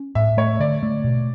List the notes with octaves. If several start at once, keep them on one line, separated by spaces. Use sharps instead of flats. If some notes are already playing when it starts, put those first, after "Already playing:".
Already playing: C#4
A2 E5
A3 C#5
D3 D5
A3
B2